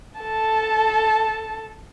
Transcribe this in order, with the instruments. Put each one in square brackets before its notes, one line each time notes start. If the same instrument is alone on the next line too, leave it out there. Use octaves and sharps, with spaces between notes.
[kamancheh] A4 A5